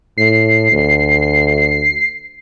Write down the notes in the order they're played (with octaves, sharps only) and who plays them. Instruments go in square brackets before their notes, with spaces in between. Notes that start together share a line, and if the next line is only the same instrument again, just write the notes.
[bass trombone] A2 [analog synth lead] C7
[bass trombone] D2